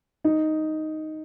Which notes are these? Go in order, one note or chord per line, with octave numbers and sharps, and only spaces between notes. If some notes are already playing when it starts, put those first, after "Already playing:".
D#4